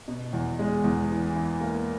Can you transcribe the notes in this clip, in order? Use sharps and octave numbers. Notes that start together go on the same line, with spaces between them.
B2
E2
G#3
E2
E3
E3
A#3